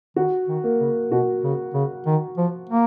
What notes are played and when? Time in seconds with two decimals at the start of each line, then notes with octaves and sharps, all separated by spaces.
0.16 D#3 F#4
0.48 D#3
0.63 A#3 A#4
0.80 C#3
1.11 B2 F#4
1.43 C#3
1.74 C#3
2.06 D#3
2.38 F3
2.70 A#3